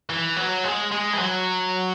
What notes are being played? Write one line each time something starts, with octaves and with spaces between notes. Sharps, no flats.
E3
F#3
G#3
G#3
E3
F#3